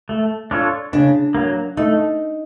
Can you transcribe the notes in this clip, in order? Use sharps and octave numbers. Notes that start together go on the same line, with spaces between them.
A3
D4 F4 A4 C#5
C#3 D4
F#3 A#3
A3 D#4